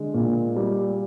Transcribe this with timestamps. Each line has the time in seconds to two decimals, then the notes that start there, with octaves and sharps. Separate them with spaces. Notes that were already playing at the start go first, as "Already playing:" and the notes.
Already playing: D3 G#3
0.14 A#2
0.56 G3